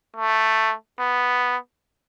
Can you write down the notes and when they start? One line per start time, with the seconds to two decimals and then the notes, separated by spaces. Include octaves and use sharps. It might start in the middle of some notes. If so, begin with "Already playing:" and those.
0.17 A3
0.99 B3